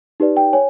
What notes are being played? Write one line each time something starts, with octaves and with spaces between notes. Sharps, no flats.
D#4 G4 B4 D5
G5
C#5 G#5